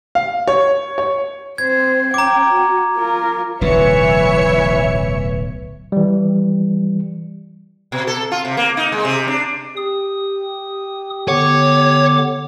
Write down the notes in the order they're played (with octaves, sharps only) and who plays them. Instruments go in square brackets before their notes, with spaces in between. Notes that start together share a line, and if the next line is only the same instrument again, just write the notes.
[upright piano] F5
C#5
C#5
[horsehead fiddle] C4 C5 [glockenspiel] G#6
[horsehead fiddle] C#4 G5 [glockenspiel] A#5 D6
[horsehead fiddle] F#4
F4 A#4
[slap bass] D1 B1 A2 [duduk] E3 [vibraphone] B4 [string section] C#5 E5 C#7
[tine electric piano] E3 G3
[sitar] B2
A4
F4
C3
A#3
D#4
G#3
C3
D4
[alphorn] G4 [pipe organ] D#6
[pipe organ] D3 B3 D6 [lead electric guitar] C#5